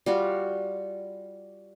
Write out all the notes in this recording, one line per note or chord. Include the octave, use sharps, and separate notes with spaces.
G3 F4 F#4